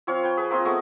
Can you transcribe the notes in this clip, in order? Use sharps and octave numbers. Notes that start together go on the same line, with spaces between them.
F3 C4 C#5 F5
B4 G5
G#4 B4
A#3 C4 F4 D#5
G#3 A3 B3 C#6